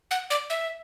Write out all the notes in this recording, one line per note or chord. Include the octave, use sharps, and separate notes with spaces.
F#5
D5
E5